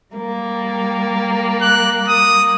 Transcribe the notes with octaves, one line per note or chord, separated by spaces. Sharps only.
G3 A#3
F#6
D#6